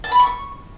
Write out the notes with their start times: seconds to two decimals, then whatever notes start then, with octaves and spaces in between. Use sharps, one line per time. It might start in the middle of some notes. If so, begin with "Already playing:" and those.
0.04 A5
0.12 B5
0.19 C#6